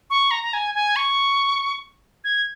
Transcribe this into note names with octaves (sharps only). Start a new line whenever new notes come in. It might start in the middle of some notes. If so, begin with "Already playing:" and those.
C#6
A#5
A#5
G#5
G#5
C#6
G#6